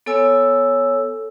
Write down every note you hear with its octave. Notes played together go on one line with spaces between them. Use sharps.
B3 A4 C#5 G#5 E6